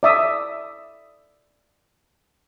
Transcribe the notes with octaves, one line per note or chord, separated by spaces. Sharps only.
D5 E5 D#6